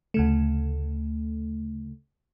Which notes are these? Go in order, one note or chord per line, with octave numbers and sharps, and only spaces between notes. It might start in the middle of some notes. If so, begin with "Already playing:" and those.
D2 C#3 A3